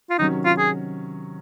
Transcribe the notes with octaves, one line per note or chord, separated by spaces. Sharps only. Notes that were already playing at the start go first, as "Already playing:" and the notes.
F4
C3 D#3 F#3 C#4 D#4
F4
G#4